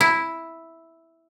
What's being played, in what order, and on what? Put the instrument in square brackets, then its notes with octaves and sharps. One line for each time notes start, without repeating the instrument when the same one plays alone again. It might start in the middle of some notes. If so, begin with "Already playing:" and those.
[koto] E4